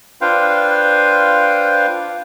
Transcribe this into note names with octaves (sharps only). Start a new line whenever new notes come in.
D4 F4 B4 C5 F5 G5